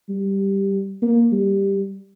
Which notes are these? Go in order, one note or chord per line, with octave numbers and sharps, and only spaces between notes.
G3
A#3
G3